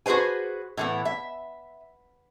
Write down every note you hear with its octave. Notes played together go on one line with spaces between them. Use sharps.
F#4 G#4 B4 C5 G#5
A2 E3 B3
E5